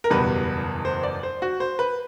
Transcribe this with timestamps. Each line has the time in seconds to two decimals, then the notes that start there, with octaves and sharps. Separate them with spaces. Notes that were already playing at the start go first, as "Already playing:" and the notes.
0.04 A#4
0.10 F#1 E2 B2 G3 B4
0.85 C5
1.03 D5
1.23 C5
1.42 F#4
1.60 C5
1.79 B4